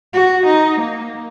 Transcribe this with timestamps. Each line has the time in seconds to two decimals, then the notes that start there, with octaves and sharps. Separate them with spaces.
0.14 F#4
0.46 D#4
0.80 A#3